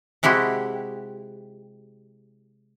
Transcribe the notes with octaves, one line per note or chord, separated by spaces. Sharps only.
C3 G#3 E4 F#4 G4